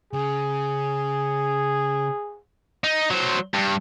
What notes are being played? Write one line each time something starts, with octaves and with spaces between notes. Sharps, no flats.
C#3 G#4
D#4
F#3 C5
G2